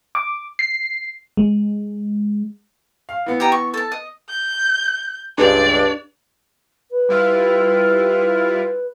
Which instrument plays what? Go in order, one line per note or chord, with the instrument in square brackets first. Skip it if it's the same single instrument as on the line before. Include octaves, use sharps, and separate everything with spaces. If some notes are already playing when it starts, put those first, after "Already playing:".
[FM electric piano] D6
C7
G#3
[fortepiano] F5
E3 B3
[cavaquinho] G4 D#5 A#5
C#6
A4 A5
D#5
[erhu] G6
[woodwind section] C#2 G2 [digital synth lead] D4 [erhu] D5
[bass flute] B4
[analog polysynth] G3 E4 F4